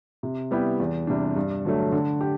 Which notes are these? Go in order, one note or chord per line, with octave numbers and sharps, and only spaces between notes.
C3
G3 B3 E4 G4
E2
C3 G3 D4
G2
D3 F#3 A3
D3
G4